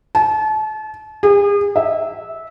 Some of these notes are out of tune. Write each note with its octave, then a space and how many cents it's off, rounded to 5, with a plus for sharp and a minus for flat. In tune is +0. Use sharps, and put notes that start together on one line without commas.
A5 -35
G#4 -40
E5 -15